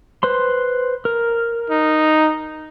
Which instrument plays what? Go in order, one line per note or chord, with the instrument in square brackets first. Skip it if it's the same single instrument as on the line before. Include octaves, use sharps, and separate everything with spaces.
[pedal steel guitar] B4 C5 C6
A#4
[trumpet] D#4